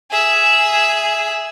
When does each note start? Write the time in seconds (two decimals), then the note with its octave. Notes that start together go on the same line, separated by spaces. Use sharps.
0.11 G#4 E5